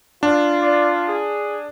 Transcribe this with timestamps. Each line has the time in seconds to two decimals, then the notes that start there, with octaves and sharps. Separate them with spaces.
0.23 D4 F4
0.62 D5
1.08 G#4